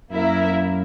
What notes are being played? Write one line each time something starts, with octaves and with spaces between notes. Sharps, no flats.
F#2 A#3 E4 A#4 E5